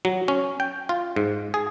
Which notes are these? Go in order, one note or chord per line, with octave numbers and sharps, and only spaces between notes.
F#3
C#4
G5
F4
G#2
G#4